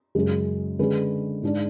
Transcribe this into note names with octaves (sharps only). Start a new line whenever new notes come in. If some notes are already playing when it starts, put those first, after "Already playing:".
F#2 C#3 G#3
D3 G#3 C#4 G#4 B4
G#2 G#3 D4